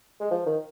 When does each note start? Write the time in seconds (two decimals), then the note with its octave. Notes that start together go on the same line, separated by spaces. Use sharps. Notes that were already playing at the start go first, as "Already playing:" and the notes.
0.20 G#3
0.31 F3
0.47 D#3